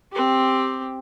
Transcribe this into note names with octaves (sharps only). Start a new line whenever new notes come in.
C4 G4